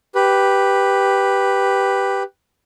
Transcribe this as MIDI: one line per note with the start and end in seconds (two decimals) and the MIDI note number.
0.15 2.23 67
0.15 2.23 71